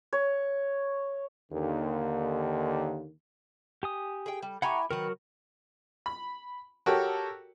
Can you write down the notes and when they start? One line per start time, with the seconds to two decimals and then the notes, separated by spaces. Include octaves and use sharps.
0.13 C#5
1.52 D#2 D3
3.83 G4 G#5 D#6
4.26 G#4 G5
4.42 G3
4.62 E4 G4 F#5 G#5 A#5 C#6
4.90 D#3 F#3 F#4 A#4 B4
6.06 B5
6.86 F#4 G4 A4 A#4 C#5 G5